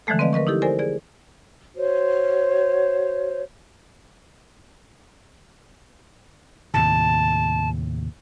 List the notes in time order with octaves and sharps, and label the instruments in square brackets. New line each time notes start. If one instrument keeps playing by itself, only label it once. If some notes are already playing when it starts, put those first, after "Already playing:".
[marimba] D3 E3 F3 G#3 A3 A4
C4 B4 D5 D#5 F5
A#4 B4 D#5 C#6
D#4 E4 G4 A4
A4 A#4 C5 D5 G#5
G#4 D5
[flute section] F#4 C5 C#5
[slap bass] D#2 A2 C3 [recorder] A5